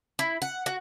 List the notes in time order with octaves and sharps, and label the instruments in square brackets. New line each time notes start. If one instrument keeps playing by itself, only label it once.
[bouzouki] E4
F#5
F#4